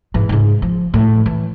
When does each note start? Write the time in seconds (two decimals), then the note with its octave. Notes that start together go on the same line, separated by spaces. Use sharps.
0.14 G#2 E3
0.29 G#2 C#3
0.62 F3
0.94 A2 F3
1.26 E3